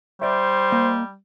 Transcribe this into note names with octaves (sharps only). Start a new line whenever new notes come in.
G3 C5 D5 E5
A#3 D#5